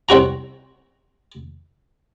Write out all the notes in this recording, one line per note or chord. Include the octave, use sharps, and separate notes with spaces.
C2 C4 F#4 A#5